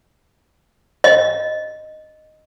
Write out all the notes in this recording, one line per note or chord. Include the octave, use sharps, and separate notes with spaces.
D#5